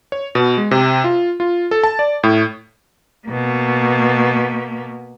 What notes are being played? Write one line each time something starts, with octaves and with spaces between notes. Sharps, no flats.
C#5
B2
G#3
C3
F4
F4
A4
A5
D5
A2
B2 A#3